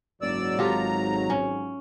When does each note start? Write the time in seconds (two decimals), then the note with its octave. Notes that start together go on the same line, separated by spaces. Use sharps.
0.22 F#1 G#2 F#3 D5 E6
0.59 G#1 F4 G4 A4 A#5
1.30 C#4